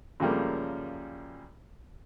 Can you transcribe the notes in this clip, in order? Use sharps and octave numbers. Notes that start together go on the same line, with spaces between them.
F#2 C#3 F3 G3 A3 A#3